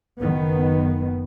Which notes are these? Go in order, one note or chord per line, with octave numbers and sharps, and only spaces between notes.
F#1 D#3 B3